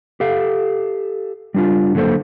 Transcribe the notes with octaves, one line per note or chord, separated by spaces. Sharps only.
G4 A4 F5
G3 D4 F4
D3 F#3 A#3 A4 C5